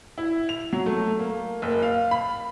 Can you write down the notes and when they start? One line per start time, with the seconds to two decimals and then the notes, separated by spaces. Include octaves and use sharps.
0.18 E4
0.49 F7
0.73 F#3
0.86 A3
1.19 A#3
1.62 F#1
1.82 F5
2.11 B5